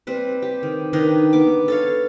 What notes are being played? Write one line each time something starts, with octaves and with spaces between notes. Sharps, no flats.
G3 C4 B4
G4
D#3
D#3 D4 D#4 B4
B3 D6
A4 C#5 F5